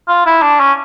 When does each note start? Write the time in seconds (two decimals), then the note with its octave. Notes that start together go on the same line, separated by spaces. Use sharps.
0.08 F4
0.26 E4
0.42 D4
0.60 C#4